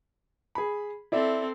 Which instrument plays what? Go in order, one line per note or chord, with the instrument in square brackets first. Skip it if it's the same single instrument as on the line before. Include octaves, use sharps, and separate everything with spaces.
[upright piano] G#4 B5
[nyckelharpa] C4 A4 [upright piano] E4 D5 E5